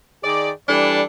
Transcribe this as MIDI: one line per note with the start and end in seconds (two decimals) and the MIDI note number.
0.23 0.50 51
0.23 0.50 68
0.23 0.50 74
0.68 1.02 52
0.68 1.02 55
0.68 1.02 62
0.68 1.02 69
0.68 1.02 74